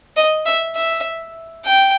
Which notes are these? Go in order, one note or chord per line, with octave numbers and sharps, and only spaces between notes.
D#5
E5
E5
G5